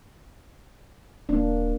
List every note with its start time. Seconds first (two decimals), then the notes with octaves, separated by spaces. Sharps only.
1.29 D#1 A#3 D4